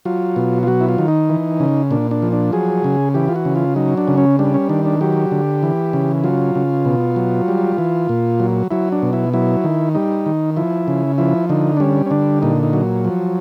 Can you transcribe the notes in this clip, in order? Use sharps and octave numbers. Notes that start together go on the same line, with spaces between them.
F#3 F4
B2
F4
F#3 F#4
E4
F4
D#3
D#4
E3
C#3
A#2 D4
D4
F3
D4
F#3 G#4
C#3
E3 G4
F4
F#4
C#3
F4
F#3 D#4
D4
C#3
C#4
G3 D4
C#4
D#3 D4
D4
F#3 G4
D3
E3
C#3
F#3 F4
C#3
B2
F#3
G3
E3
A#2
F#3
F#3 E4
D4
B2
E4
F#3 E4
D#3
G3 D#4
D#3
F3 E4
C#3
F3 E4
D3 D#4
D4
G3 C#4
C#4
D3 D4
A#2 D#4
D#4
F#3
F3